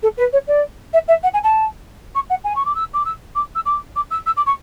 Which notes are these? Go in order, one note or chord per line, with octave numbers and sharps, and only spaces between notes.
A4
B4
C#5
D5
E5
E5
F#5
G#5
A5
C#6
F#5
G#5
C#6
D6
E6
D6
E6
D6
E6
D6
D6
E6
E6
D6
C#6